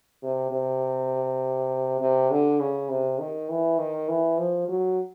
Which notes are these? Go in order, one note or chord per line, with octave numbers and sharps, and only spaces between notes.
C3
C3
C3
D3
C#3
C3
D#3
E3
D#3
E3
F3
F#3